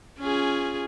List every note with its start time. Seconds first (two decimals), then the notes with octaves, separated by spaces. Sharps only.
0.19 C#4 F4 G#4